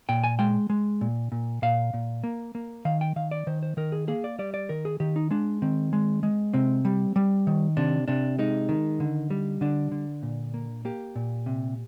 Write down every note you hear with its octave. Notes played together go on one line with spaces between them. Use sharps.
A#2 G5
G#5
G#3 G5
G#3
A#2
A#2
A#2 F5
A#2
A#3
A#3
D#3 F5
G5
D#3 F5
D5
D#3 C5
C5
D#3 A#4
G#4
A#3 G#4
D5
G3 D5
D5
D#3 A#4
G#4
D#3 G4
D#4
G#3 D4
D#3 C4
G#3
G#3
C3 C4
G3
G3
D#3
C3 D4
C3 D4
G#3 D#4
D#3
D3
G3
D3 D4
D3
A#2
A#3
A#3 G4
A#2
C3